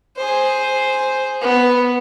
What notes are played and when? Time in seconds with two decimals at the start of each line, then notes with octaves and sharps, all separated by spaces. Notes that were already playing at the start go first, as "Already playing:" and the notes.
0.17 G#4 C5
1.41 B3